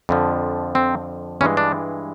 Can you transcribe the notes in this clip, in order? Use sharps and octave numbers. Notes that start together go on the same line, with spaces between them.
F2 D3 F3
C4
G2 E3 G#3 C#4
D4